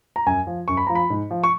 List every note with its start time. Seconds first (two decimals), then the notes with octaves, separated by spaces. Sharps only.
0.16 A#5
0.26 F#2 G#5
0.47 F3
0.68 F#2 C#6
0.77 B5
0.87 F3 A#5
0.95 B5
1.10 G#2
1.31 F3
1.44 C#6